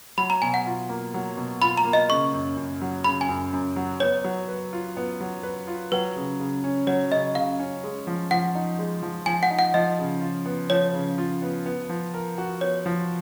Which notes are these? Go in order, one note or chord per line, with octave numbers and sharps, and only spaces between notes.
F#3 B5
A#5
B2 G#5
F#5
F4
A#3
F#3
B2
F4 B5
A#5
A#3
D#5
C#3 C#6
F#2
F#2
F#3
C#3 B5
G#5
F#2
F#2
F#3
B3 C#5
F#3
B4
F4
B3
F#3
B4
F4
F#3 B4
C#3
C#3
C#4
F#3 C#5
C#3 D#5
C#3 F5
C#4
G#3
F3
F3 F#5
D#4
G#3
F3
F3 G#5
F#5
D#4
F#5
F3 D#5
C#3
F4
B3
F3 C#5
C#3
F4
B3
B3
F3
A#4
F#4
B3 C#5
F3